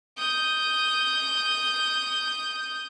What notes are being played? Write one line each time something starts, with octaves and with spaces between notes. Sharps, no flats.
D#6 G6